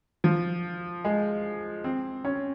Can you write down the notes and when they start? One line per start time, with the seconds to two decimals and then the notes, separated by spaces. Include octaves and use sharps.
0.24 F3
1.05 G#3
1.84 C4
2.25 C#4